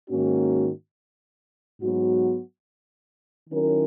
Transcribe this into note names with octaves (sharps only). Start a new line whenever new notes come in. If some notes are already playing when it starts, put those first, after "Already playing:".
G#2 D#3 A#3 C#4 F#4
G#2 F#3 B3 F#4
D#3 F#3 C#4 E4 A#4